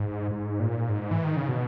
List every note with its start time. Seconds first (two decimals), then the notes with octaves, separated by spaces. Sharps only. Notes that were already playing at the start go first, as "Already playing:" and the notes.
Already playing: G#2
0.31 G#2
0.60 A#2
0.89 G#2
1.11 E3
1.24 D#3
1.37 C#3
1.48 B2